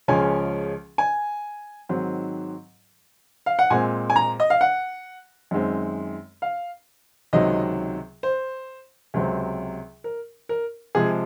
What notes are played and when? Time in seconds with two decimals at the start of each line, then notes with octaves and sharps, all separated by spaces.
0.08 C#2 C#3 F3 G#3 C#4 G#5
0.98 G#5
1.89 G#2 D#3 F#3 C4
3.46 F5
3.59 F#5
3.70 A#2 G#3 C4 G#5
4.10 G#5
4.16 A#5
4.40 D#5
4.50 F5
4.61 F#5
5.51 F#2 D#3 G#3 C4
6.42 F5
7.33 C#2 C3 D#3 F#3 C4 D#5
8.23 C5
9.14 C#2 C3 F#3 C4
10.04 A#4
10.49 A#4
10.95 C3 F3 G#3 G#4